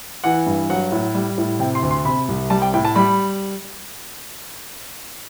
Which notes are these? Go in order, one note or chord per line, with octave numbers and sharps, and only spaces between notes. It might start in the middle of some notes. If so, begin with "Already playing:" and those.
E3 F#5
G2
F#3 F#5
A2
G3
A2
C3 G5
C6
D2
C6
C3 B5
C2
G3 A5
G5
A2 G5
A5
G3 B5